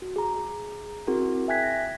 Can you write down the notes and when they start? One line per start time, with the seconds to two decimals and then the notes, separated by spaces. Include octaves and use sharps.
0.02 F#4
0.16 G#4 A#5
1.07 C4 E4 F#4 G#4 A#4
1.48 E5 G5 G#5 F#6 G#6 B6
1.63 A#6